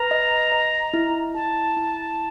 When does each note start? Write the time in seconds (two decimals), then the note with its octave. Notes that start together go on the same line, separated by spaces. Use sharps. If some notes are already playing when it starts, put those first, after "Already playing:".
Already playing: B4 A#5
0.11 D#5
0.52 D#5
0.94 E4
1.34 E4 A5
1.77 E4